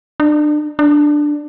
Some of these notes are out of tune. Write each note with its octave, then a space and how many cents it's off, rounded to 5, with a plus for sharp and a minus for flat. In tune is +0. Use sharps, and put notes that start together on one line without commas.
D4 +30
D4 +5